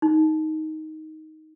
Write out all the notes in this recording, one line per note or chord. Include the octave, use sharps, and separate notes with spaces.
D#4